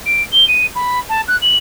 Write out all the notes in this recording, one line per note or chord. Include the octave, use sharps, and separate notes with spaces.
D7
G7
D#7
B5
A5
F#6
F#7